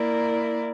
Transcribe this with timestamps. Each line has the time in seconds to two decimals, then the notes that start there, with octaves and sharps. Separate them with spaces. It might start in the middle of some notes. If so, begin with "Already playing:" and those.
Already playing: A#3 E4 A#4 D5